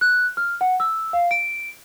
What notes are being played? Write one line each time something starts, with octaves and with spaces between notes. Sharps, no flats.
F#6
F6
F#5
E6
F5
D7